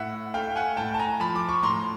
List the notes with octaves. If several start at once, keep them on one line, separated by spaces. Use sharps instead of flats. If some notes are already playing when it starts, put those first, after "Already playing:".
Already playing: A2 E5 F#5
A3 F5 G5
F#5 G#5
A2 G5 A5
A5
G#5 A#5
F3 A5 B5
D6
C#6
A2 A#5 C6